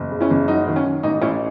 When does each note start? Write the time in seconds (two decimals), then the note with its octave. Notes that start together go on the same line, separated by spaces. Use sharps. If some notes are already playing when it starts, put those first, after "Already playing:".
Already playing: F#1
0.12 C#3
0.20 C#4 E4
0.30 F#1
0.48 F#3 D#4
0.67 D#3
0.76 C#4
0.85 D#3
1.03 A1 D#4
1.21 A1 C#4 E4